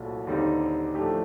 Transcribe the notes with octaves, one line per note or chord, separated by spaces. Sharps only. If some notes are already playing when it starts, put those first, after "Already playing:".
Already playing: C2 A#2 F#3 A3
D#2 D3 G3 C4 D#4
A2 F3 A3 D4 G4